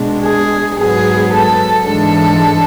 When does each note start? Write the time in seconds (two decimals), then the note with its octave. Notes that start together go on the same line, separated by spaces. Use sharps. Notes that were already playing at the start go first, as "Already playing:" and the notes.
Already playing: B2 G#3 D4
0.23 G#4
0.77 G#2 F#3 B3 G#4
1.32 A4
1.87 G#2 E3 G#3 D4 A4